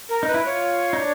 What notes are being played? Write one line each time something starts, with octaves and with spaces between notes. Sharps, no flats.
A#4
D#4 B4
E4
F4 C#5
D#4
D4